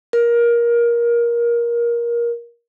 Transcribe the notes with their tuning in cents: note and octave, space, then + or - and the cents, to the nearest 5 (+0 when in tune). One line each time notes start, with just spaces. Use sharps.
A#4 +20